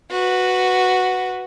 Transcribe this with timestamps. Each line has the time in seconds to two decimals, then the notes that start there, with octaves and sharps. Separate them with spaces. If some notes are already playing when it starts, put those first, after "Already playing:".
0.11 F#4 B4